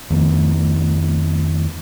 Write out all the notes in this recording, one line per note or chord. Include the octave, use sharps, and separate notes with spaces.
F2 D#3 A3 B3